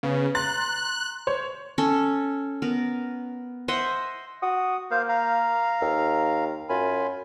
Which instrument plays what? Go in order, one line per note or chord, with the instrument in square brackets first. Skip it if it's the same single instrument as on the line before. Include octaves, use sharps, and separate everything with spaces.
[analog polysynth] C#3 [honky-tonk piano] B3
[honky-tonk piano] A#5 C6 A6 [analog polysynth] F#6
[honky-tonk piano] C5 C#5
[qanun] C#4 A4
B3 A#4
C5 D#5 E5 F#5
[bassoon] F#4 [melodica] D#6
[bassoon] A#3 [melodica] C5 F5
[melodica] F5 A#5
[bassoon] D#2
[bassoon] F#2 [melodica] F4 G#5 B5